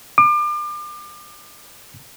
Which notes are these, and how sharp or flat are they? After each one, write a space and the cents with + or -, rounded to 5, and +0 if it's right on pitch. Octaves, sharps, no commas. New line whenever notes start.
D6 +35